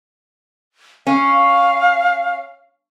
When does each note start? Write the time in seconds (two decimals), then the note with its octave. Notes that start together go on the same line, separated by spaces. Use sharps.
1.07 C#4 F5